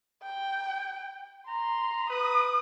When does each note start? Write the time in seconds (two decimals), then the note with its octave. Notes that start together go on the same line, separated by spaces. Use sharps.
0.23 G5
1.48 A#5 C6
2.10 B4 D#6